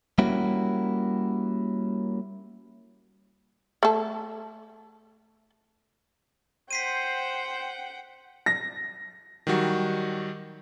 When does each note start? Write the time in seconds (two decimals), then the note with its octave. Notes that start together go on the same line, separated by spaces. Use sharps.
0.18 G3 A#3 C#4 E4 F#4
3.83 A3 A4
6.71 C5 F#5 G5 B6 C7 D#7
8.46 A#6
9.47 D#3 F#3 G3 F#4